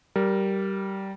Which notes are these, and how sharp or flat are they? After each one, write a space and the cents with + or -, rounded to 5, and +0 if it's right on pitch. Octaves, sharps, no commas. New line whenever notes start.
G3 -15 A#4 +0